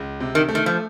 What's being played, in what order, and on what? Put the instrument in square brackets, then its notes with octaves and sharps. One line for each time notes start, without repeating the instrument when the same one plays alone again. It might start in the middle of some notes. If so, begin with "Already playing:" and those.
Already playing: [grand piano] C#2
C3
[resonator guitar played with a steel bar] D#3
[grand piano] A3
[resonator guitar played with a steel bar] D#3
F3